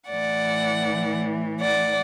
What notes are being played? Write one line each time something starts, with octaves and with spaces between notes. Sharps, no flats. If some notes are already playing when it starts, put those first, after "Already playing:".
A2 E3 D5 F#5
D5 F#5